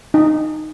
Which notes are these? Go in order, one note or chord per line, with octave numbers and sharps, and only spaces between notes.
D#4